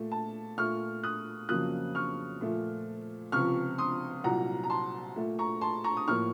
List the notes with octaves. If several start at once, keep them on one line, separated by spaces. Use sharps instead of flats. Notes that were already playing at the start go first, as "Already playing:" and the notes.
Already playing: A#2 A3
A5
A#2 A3 C#6 F6
D#6 F#6
F2 C#3 F#3 A#3 D#6 F#6
C#6 F6
A#2 F3 A3
C#2 C3 F3 C#6 F6
C6 D#6
C2 A#2 F#3 F#5 A#5
A#5
A5 C6
A#2 A3
A#5 C#6
A5 C6
A#5 C#6
D#6
A2 F3 A#3 C#6 F6